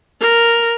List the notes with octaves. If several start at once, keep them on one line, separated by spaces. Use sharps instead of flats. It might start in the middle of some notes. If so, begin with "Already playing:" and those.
A#4